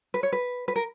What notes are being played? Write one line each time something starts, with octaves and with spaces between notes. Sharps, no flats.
B4
C#5
B4
B4
A#4